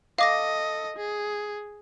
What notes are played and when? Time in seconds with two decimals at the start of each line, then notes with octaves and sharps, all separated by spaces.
0.19 A4 D#5 F5 D6 A#6
0.96 G#4